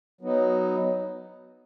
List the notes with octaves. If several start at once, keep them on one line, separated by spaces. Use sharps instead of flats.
F#3 B3 D#4